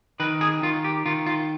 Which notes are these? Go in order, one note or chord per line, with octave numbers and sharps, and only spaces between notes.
D#3 B4
G#4
D#3 F4
G4
D#3 F4
F4